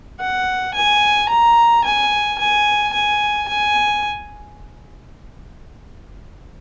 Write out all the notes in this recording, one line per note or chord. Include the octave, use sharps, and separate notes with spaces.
F#5
G#5
A#5
G#5
G#5
G#5
G#5